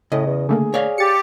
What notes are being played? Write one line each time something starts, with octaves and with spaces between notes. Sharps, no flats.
A2 C#3 D#5
E2
D3 A3 A#3 G#4
C#5 D5 F5
G4 A6 C#7